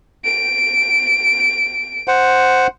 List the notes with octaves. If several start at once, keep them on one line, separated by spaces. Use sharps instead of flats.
D7
C5 F#5